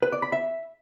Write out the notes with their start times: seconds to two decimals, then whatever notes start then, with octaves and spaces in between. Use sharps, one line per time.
0.02 B4
0.12 D5
0.22 B5
0.32 E5